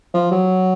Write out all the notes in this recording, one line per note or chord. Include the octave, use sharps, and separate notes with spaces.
F3
F#3